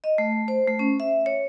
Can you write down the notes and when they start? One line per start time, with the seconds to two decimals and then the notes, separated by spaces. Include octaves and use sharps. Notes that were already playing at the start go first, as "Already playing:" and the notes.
0.04 D#5
0.18 A3
0.48 C5
0.68 A3
0.79 C#4
1.00 E5
1.26 C#5